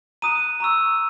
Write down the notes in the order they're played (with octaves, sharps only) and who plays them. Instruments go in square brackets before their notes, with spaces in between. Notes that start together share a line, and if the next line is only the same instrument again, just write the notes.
[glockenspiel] A#5 D#6 F#6 D#7
A#5 C#6 E6